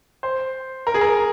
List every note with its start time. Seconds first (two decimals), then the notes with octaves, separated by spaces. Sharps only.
0.23 C5
0.87 A#4
0.94 G#4
1.01 A#4